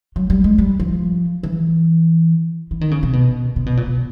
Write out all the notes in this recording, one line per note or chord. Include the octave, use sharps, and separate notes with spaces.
F#3
G3
G#3
G3
F3
E3
E3
D#3
C#3
C3
B2
C3
B2
A#2
B2